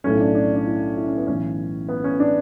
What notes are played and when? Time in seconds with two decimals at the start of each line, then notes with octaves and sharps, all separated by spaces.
0.04 B1 A2 F#3 A3 C#4
0.20 D4
0.35 D4
0.56 D4
0.66 E4
0.97 E4
1.07 C#4
1.17 B3
1.27 B1 A2 E3 C#4
1.89 B3
2.04 C#4
2.20 D4